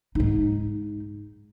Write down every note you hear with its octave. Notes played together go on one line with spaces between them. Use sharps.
G#2 D#4